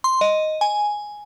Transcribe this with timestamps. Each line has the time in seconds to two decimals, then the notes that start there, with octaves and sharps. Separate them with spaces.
0.04 C6
0.21 D#5
0.61 G#5